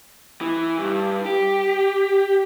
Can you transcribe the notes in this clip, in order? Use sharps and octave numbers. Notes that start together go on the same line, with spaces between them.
E3
G2
G4